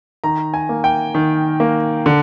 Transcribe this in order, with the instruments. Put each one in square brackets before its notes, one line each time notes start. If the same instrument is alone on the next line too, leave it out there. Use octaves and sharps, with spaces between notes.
[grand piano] D#3 A#5
G#5
A#3
G5
D#3
A#3
D3